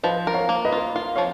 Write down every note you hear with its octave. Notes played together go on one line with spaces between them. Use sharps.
F3 B4 D#5
A#4
C#5 F5
A#3
B4 D#5
F4
F4 F5
F3 C#5 F5